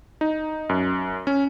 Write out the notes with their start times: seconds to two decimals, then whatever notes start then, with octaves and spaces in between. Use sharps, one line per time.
0.21 D#4
0.69 F#2
1.27 C#4